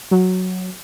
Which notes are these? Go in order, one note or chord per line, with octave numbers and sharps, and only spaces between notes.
F#3